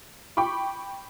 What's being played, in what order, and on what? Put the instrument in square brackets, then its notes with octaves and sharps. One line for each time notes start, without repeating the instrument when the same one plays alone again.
[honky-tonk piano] G5 B5 C#6 D6